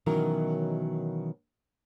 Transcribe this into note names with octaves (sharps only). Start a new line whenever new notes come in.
B2 D#3 E3 F#3 C#4 A#4